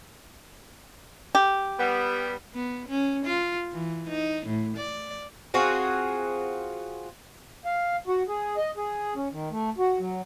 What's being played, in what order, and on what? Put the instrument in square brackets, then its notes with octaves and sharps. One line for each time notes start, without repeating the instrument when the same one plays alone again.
[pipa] G4
[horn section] G3 B3
[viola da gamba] B3
C#4
F4
E3
D#4
A2
D5
[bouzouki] C4 F4 F#4 G#4
[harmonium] F5
F#4
G#4
D#5
G#4
C#4
D#3
A3
F#4
F#3